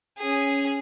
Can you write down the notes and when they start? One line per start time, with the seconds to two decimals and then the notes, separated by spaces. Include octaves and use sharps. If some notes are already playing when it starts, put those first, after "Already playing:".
0.18 C#4 G#4